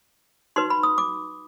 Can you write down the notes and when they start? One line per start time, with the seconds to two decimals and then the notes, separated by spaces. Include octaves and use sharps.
0.56 D#4 F#4 B4 C6
0.70 B5
0.83 D#6
0.98 D6